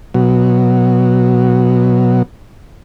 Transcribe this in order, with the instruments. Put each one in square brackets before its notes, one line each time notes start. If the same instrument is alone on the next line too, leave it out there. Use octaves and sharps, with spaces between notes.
[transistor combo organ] B2 F#3